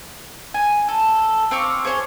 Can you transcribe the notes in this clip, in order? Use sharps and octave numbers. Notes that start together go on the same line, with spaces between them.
G#5
A4
C4 F5 C#6 D6
G#4 C5 C#5